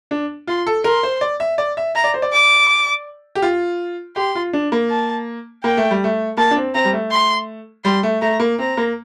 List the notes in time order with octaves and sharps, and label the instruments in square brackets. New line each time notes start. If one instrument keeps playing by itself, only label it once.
[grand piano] D4
[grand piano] F4 [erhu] C6
[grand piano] A4
[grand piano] A#4 [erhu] C6
[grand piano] C5
D5
E5
D5
E5
[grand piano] E5 [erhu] A#5
[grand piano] D5
C5
D5
[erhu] D6
[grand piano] G4
F4
[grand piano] G4 [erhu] C6
[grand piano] F4
D4
A#3
[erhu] A5
[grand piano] A#3 [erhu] G5
[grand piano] A3
G3
A3
[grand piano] A#3 [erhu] A5
[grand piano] D4
C4
[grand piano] C4 [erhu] A#5
[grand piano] G3
A3
[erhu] C6
[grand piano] G3 [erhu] C6
[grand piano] A3
[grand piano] A3 [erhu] A#5
[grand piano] A#3
[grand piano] C4 [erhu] A#5
[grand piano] A#3